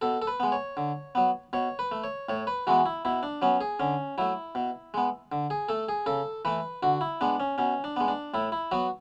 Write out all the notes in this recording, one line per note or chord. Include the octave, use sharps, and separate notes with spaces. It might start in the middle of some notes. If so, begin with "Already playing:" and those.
B2 A4
A4
B4
G#3 B3
C#5
D3
F#3 B3
B2 C#5
B4
A3
C#5
A2 C#5
B4
E3 G#3 B3 F#4
E4
B2 E4
D4
F#3 B3 C#4
G#4
D3 C#4
F#3 A3 E4
B2
G#3 B3
D3
G#4
A3 A4
G#4
C#3 A4
E3 A3 B4
D3 F#4
E4
G#3 B3 D4
C#4
B2 C#4
D4
G#3 B3
D4
A2 E4
E4
F#3 B3 F#4